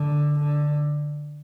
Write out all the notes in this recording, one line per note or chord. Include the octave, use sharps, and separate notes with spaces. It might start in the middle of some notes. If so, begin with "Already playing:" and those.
Already playing: D3
D3